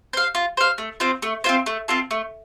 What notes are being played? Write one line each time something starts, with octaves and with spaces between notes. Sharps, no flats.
C5 F5
F4
C5 F5
A3
C4 F4 C5
A3
C4 F4 C5
A3
C4 F4 A4
A3